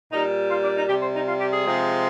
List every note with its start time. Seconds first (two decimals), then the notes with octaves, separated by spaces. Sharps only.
0.12 A#2 G3 D#4
0.50 F4
0.63 D4
0.76 D#4
0.89 C3 G3 G4
1.01 C5
1.15 D#4
1.27 F4
1.40 G4
1.52 G#4
1.66 C3 F3 G#3